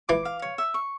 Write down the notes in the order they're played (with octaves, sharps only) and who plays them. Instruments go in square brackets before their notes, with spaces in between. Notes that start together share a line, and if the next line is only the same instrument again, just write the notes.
[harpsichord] E3 [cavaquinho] D6
[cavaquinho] F5
C#5
E5
C#6